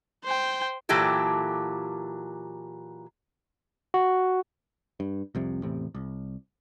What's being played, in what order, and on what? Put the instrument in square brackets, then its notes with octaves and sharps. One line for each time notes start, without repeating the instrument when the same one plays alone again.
[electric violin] C5 G5
[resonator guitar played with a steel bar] A#2 E3 F#3 G4 A4
[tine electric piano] F#4
[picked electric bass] G2
C2 F2 C3
A1 E2 A2 C3
C2